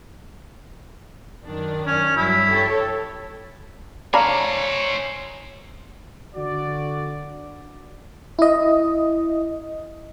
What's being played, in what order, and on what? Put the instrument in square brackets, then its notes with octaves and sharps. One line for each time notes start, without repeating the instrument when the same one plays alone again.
[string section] F#2 D#3 D4
[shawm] C#4
[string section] G2 F#3 [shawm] E4
[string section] G4 A4 C#5
[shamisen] D4 [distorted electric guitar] C5 G#5 [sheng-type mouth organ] C#5 [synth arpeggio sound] F5 A#5 B5
[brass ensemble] D3 F#4 D5
[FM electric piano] E4 D#5